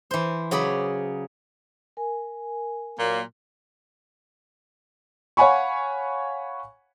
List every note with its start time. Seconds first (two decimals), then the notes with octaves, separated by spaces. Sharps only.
0.11 E3 C5
0.51 C#3 F#3 G#4 D5 B5
1.97 A#4 G#5
2.98 A#2 F#3 A#3
5.37 C#5 F5 F#5 G#5 B5 C#6